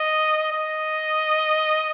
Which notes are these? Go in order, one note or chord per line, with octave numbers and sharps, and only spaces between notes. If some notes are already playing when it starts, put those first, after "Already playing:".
Already playing: D#5
D#5